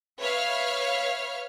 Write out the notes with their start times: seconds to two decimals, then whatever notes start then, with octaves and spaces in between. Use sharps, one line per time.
0.20 B4 C#5 E5 F5 F6